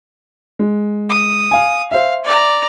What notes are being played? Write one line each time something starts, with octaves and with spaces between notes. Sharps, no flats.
G#3
D#6
F5 G#5
C5 E5 F5
D5 A#5